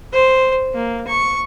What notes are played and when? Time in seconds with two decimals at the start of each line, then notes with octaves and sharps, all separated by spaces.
0.13 C5
0.74 A#3
1.07 C#6